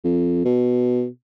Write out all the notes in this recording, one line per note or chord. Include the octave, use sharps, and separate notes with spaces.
F2
B2